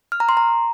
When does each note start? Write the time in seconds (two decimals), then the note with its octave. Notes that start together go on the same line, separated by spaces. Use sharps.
0.12 F6
0.20 A#5
0.29 C6
0.37 A#5